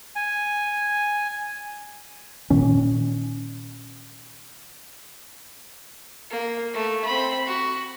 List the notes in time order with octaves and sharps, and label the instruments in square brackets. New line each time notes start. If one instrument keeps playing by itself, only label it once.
[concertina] G#5
[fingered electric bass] A#2 D#3 C#4
[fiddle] A#3
A3
C4 B5
F#4